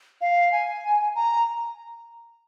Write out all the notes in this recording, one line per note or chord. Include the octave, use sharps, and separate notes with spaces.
F5
G#5
A#5